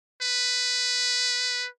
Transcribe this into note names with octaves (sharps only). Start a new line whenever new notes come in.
B4